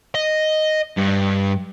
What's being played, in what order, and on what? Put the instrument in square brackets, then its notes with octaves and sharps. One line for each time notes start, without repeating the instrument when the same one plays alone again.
[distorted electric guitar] D#5
G2